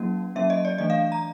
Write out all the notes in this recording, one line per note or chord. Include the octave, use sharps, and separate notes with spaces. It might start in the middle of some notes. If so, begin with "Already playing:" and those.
Already playing: F#3 A#3 C#4
F#3 A#3 C#4 E5
D#5
D5
E3 A3 D4 D#5
F5
A#5